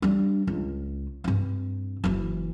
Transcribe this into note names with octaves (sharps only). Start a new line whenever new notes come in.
G3 D4
C#2
G2 C4
F#1 E3